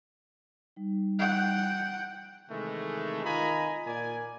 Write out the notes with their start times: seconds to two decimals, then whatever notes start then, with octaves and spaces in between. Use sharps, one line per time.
0.76 G3 D#4
1.19 F#5 G5
2.50 C3 D#3 E3 G#3 A3
3.24 D#3 F4 D#5 G#5 A#5 B5
3.86 A#2 A#4 D5 G#5